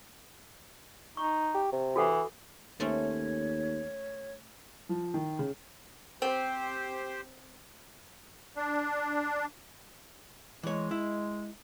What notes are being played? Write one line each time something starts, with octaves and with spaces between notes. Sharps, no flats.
D#4 C#6
G4
C3
E3 F#4 A4 F#5
D#2 A3 C4 C#4 C#5
F3
D#3
C#3
C4 G4 C5
D4
E3 G#3 C#5
E4